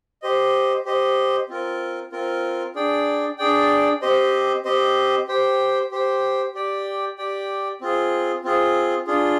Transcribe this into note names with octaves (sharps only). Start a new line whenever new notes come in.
G4 C5 D#5
G4 C5 D#5
C4 F4 A#4
C4 F4 A#4
D4 G#4 D5 G5
D4 G#4 D5 G5
C4 G4 C5 D#5
C4 G4 C5 D#5
G4 C5 G5
G4 C5 G5
G4 D5 G5
G4 D5 G5
C4 F4 G#4
C4 F4 G#4
D4 F4 G#4